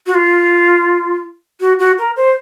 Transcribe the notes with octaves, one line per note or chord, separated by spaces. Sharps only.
F#4
F4
F#4
F#4
A#4
C5